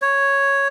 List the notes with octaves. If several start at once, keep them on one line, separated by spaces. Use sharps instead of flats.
C#5